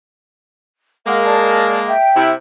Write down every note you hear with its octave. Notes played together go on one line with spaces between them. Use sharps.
G#3 A#3 D#5 F5 F#5
D5 A5
E5 G5
C3 E4